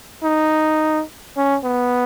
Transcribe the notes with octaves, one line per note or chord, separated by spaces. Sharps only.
D#4
C#4
B3